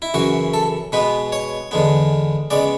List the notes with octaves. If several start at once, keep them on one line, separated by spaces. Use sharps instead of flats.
E4
F#2 C#3 E3 F#4
A4
B2 G#3 B3 B4
C#5
E2 D3 G#3 B3
C#3 G#3 B3 D5